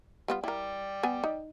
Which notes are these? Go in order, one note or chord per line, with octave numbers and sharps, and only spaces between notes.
G3 B3 F4
E4 A#4 D5 G5
B3 G#5
D#4